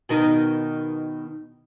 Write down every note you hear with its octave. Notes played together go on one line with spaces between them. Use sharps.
B2 D#3 D#4